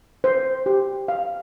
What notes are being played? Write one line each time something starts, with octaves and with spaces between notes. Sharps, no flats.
C5
G4
F5